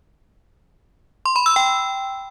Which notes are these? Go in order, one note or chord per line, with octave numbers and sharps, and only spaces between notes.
C6
B5
E6
G5